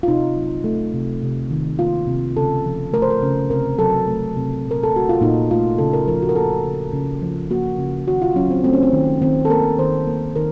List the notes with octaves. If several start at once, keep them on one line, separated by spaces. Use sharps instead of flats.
F4
C3 D#4
F#3
A3
C3
C3
D#3
A#3 F4
C3
C#3 A4
F3
A3 A#4
C5
A#4
C#3
C3 A#4
F#3 A4
A3
C3
A#2
A#4
A4
A3 F#4
F4
A#2 D#4
A3 F4
C#3 A4
A#4
F3 A#4
F#4
A#4
A#3 A4
C#3
C#3
F3
A#3 F#4
C#3
D#3 F#4
F4
F#3 C#4
C4
A3 C4
C#4
C4
D#3
D#3 C4
A4
A#3 A#4
D#3 C5
A#3
D#3 A#4